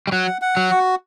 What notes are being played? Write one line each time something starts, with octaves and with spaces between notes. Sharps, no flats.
G3
F#3 F#5
F#5
F#3
F#4